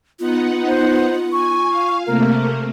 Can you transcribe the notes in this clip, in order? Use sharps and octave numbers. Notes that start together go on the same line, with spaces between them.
B3 D#4 F4 F#5
C5
G#5 C#6
F5
C3 A3 A#3 A#4